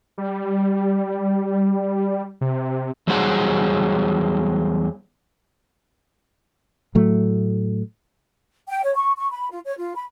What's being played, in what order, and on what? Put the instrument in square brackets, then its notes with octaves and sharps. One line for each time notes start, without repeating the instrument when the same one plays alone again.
[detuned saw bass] G3
C3
[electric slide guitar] E2 F#3 G3 G#4 C5 F#5
[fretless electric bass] A2 F#3 A3
[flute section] G5
C#5
C#6
C#6
B5
F4
C#5
F4
B5